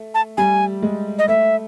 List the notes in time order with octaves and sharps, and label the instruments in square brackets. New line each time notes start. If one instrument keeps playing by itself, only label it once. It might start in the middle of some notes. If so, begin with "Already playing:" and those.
Already playing: [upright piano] A3
[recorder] A5
[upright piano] G3 [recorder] G#5
[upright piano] G#3
[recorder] D#5
[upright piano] A3 [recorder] E5